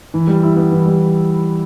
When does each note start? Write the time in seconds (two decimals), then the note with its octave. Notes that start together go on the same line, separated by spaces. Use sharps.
0.14 E3
0.27 G3
0.43 E4
0.56 B3
0.72 E3
0.86 G3